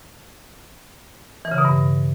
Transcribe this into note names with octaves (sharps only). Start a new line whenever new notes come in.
E3
C#3
B2
G2